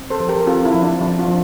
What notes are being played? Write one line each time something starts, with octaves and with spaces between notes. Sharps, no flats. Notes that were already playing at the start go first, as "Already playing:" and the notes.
Already playing: C4
A4 C5
F3
G4 A#4
C4 F4 A4
E4
F3
D4
F3 D4
D4 F4
F3